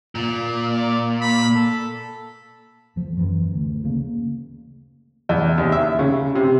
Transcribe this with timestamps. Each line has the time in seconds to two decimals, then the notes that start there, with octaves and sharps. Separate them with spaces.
0.15 A#2
0.69 D5
1.21 B5
1.56 A4
2.96 E2 F3
3.17 F#2 E3
3.51 D2
3.84 C#3 A#3
5.29 E2
5.58 D#2
5.72 E5
5.99 C#3
6.35 C3